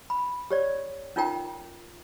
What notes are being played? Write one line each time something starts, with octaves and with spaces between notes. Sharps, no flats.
B5
G4 C#5 D5
C#4 D#4 F4 A#4 G5 A#5